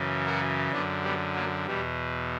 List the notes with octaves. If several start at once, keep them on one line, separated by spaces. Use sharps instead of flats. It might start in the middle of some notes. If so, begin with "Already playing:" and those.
Already playing: F#2 C#3 E3
F#4 A#4
F#2 D3 B3 D4
G3 B3
F#3 A#3
E2 B2 G3